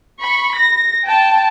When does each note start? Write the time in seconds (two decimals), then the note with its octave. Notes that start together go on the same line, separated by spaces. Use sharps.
0.20 B5 C#6
0.55 A#6
1.05 G5 A5